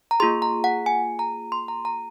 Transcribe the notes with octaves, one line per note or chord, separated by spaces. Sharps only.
A#5
A#3 F4 G#4 C6
A#5
F#5
G#5
A#5
C6
A#5
A#5